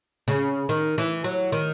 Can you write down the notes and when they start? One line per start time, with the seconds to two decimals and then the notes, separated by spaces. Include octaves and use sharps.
0.28 C#3
0.69 D#3
0.98 E3
1.24 F#3
1.52 D#3